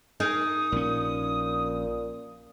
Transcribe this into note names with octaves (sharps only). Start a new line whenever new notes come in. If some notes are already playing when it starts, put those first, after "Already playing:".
D#4 G#4 A#4 D#6
A#1 A#2 C#4